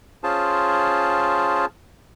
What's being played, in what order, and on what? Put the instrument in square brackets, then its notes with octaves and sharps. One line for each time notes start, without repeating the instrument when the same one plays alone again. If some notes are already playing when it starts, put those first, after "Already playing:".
[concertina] C#4 F4 G#4 C5 A5